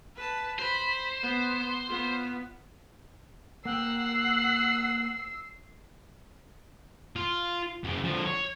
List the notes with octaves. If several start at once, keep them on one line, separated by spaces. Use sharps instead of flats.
B4 A5
C5 B5
B3
B3 F4
A#3 F#5 G5 E6 C7
F4
F#2 C#3
D3 F3
C#5